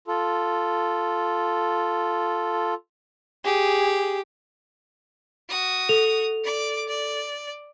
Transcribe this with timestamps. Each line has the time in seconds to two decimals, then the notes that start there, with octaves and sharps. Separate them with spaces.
0.07 F4 A4
3.44 G4 G#4
5.49 F#4 D#6
5.89 A4 F7
6.44 D5 D6
6.88 D5